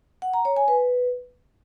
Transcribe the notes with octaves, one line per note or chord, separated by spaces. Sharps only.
F#5
A#5
C#5
G#5
B4